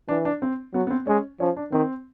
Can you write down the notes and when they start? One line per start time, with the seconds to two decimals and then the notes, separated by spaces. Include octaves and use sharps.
0.09 E3 D4
0.25 D4
0.42 C4
0.74 F#3 B3
0.87 B3
0.90 C4
1.07 G#3 C#4
1.40 F3 C#4
1.57 D4
1.72 D#3 C4